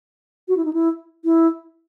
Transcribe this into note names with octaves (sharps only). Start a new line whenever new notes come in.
F#4
E4
D#4
E4
E4